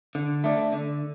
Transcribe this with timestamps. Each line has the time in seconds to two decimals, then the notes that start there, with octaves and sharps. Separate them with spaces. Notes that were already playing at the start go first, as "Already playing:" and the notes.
0.15 D3
0.44 A3 D4
0.72 D3